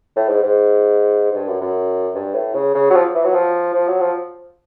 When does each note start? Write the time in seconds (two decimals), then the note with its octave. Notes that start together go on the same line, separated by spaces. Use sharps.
0.16 A2
0.29 G#2
0.42 G#2
1.31 G#2
1.35 G2
1.48 F#2
1.61 F#2
2.15 G2
2.34 A2
2.54 C#3
2.74 C#3
2.90 F#3
2.95 F3
3.14 E3
3.24 F#3
3.34 F3
3.74 F3
3.88 F#3
4.01 F3